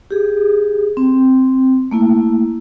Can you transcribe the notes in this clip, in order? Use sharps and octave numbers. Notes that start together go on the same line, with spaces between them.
G4 G#4
C4
A3 A#3 E4